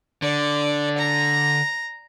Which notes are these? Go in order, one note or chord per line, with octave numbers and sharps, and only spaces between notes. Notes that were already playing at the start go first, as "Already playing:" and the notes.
D3 D5
A#5